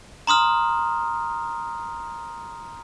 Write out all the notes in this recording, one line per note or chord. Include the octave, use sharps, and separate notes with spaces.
A#5 C6 D#6 F6